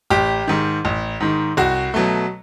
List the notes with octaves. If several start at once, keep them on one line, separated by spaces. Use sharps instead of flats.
A1 G4
G#2 D#3
A1
G#2 D#3
C2 F#4
B2 F#3 A3